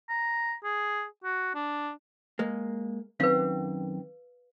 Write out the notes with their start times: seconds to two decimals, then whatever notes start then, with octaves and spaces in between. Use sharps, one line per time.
0.09 A#5
0.64 G#4
1.24 F#4
1.55 D4
2.39 G#3 A#3
3.20 F#2 D#3 C4 B4 F5